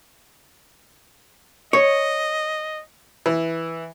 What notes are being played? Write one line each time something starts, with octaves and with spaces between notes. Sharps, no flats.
C#5 D#5
E3